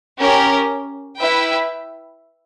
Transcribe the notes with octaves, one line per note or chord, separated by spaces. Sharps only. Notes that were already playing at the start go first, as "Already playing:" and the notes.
C#4 G4 A#4
E4 B4 E5 G5